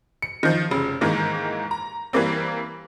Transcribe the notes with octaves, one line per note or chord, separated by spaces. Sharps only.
C#7
D#3 F3
F1 C#3
G#2 D#3 E3 A#3
A#5
E3 G3 A#3 C4